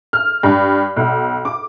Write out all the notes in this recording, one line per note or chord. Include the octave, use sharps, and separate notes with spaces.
F6
G2
B1
D6